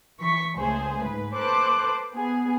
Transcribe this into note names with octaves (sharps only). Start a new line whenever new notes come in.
E3 C#6 B6
C#2 A3 G#4 C5
G#2 B4
A4 B4 C5 D6 F#6
B3 G#4